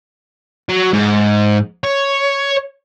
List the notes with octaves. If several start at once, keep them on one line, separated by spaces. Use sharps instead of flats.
F#3
G#2
C#5